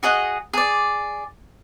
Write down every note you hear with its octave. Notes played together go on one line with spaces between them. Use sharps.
F#4 G#4 D#5 F#5
G#4 D5